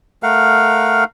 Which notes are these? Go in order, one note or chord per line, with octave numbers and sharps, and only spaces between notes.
A3 A#4 F5 F#5